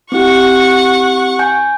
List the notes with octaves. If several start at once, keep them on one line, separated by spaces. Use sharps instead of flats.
C4 E4 G4 F#5 C#6
G#5 G6